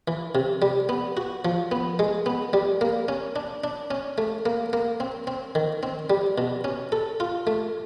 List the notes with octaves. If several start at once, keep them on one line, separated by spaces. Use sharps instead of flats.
E3
C3
G3
B3
F#4
F3
B3
G#3
B3
G3
A#3
C#4
D4
D4
C#4
A3
A#3
A#3
C4
C4
D#3
C4
G3
B2
C#4
A4
F4
A3